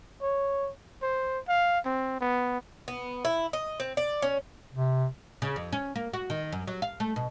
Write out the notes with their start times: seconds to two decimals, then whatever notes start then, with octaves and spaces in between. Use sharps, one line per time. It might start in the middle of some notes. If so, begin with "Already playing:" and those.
0.22 C#5
1.02 C5
1.48 F5
1.85 C4
2.21 B3
2.88 B3
3.25 E4
3.53 D#5
3.80 C4
3.97 D5
4.22 C#4
4.74 C3
5.42 C#3
5.56 F2
5.73 C#4
5.96 A#3
6.13 F#4
6.30 D#3
6.53 F#2
6.67 F#3
6.82 F5
7.00 A3
7.16 B2